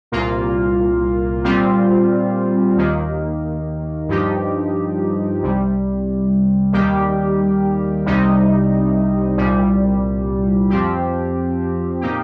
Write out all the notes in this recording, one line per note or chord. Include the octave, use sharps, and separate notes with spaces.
C2 A#2 A#3 F4
A#2 G3 C4 F4
D#2 D#3 A#3
G2 F3 D#4 G4
C2 C3 G3
D#2 D#3 G3 A#3 G4
C2 C3 G3 D#4
C2 A#2 G3
F2 F3 C4 G4
A#2 A#3 D#4 G4